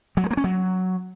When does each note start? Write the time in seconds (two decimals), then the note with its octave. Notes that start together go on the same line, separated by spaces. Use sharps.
0.17 F#3
0.24 G#3
0.31 A#3
0.37 C#4
0.44 F#3